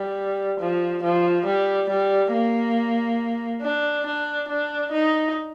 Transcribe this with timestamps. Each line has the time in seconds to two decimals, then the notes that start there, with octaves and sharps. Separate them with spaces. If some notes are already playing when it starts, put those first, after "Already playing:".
Already playing: G3
0.60 F3
1.03 F3
1.46 G3
1.89 G3
2.32 A#3
3.62 D4
4.06 D4
4.48 D4
4.92 D#4